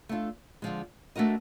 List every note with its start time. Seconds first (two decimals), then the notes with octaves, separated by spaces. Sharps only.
0.09 A3 D4 F4
0.62 D3 F3 G#3
1.16 A3 D4 F#4 A#4 D#5